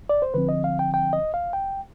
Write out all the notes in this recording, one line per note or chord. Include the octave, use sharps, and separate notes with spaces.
D5
C5
D3 F3 C4 B4
D#5
F5
G5
G5
D#5
F5
G5